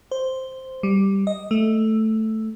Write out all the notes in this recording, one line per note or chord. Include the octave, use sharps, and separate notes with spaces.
C5
G3
D#5
A3